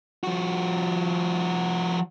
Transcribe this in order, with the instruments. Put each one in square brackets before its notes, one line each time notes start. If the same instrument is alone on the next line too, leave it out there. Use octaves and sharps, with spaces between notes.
[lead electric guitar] F3 F#4